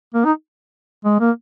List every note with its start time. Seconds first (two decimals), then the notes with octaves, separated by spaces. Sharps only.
0.14 A#3
0.25 D#4
1.05 G#3
1.20 A#3